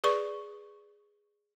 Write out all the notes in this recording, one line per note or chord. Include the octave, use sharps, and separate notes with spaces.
G#4 B4 D5 C#6